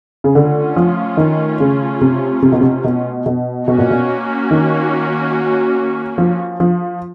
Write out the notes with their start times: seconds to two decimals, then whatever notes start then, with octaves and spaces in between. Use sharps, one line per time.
0.24 C#3
0.34 D3 A3 C#4 F4
0.76 F3
1.17 D#3
1.60 C#3
2.01 C3
2.42 C3
2.52 B2
2.61 C3
2.84 B2
3.26 B2
3.68 B2 A#3 C#4 F#4
3.78 A#2
3.91 B2
4.51 D#3
6.18 F3
6.60 F3